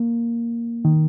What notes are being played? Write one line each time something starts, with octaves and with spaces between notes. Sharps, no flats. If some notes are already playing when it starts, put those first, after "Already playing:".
Already playing: A#3
D#3